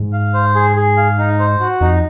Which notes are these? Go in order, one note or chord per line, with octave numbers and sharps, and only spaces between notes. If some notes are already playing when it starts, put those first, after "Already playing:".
Already playing: G#2
F5
C5
G#4
G#4
F5
D#4
C5
F#4
F2 D#4